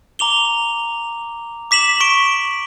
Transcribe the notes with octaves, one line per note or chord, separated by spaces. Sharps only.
A#5 D6 F7 G7
D6 B6 E7 F#7
C#6 B6 D7